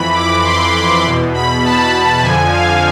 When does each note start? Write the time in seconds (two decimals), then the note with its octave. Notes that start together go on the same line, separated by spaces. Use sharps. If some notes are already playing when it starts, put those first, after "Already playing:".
Already playing: F2 E3 B5
0.14 D6
0.44 C6
1.04 E2 B2
1.33 B5
1.63 A5
2.22 F2 D3 F3 G#5
2.52 F5